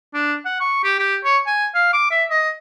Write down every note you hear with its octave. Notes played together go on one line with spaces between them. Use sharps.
D4
F#5
C#6
G4
G4
C#5
G#5
F5
D6
E5
D#5